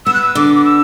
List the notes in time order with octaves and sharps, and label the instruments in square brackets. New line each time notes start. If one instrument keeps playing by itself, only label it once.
[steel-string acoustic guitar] B3 [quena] E6
[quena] F#6
E6
[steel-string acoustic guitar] D3 [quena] D6
[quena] D6
E6